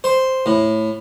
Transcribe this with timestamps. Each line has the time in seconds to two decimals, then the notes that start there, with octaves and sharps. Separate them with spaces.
0.04 C5
0.46 A2